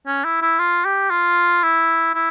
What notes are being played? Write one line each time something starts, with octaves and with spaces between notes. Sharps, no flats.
C#4
E4
E4
F4
G4
F4
E4
E4